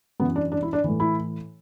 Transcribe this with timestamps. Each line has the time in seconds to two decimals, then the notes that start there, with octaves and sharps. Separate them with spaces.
0.20 F#2 E3 B3
0.36 D4
0.52 D4
0.63 E4
0.73 D4
0.84 A2 E3
1.00 E4